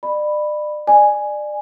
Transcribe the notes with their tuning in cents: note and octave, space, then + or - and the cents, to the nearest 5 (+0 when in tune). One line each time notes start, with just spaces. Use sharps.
D5 +35 B5 +0
D5 +25 G#5 +0